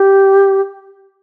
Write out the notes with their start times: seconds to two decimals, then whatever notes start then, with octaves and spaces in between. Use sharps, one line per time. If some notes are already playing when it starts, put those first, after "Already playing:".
Already playing: G4